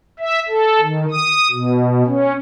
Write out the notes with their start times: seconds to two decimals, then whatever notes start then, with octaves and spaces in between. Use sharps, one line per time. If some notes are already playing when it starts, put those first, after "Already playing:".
0.19 E5
0.48 A4
0.81 D#3
1.11 D#6
1.51 B2
2.06 C#4